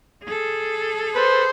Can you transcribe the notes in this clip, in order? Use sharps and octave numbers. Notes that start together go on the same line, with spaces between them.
G#4 A4
B4 C5